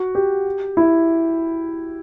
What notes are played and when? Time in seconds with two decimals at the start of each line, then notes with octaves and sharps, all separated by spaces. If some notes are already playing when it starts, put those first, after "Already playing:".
Already playing: F#4
0.15 G4
0.77 E4